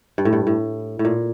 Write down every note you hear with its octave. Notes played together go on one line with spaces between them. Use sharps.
G2
A2
G2
A2
A2
A#2